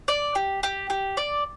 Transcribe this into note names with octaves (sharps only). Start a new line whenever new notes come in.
D5
G4
G4
G4
D5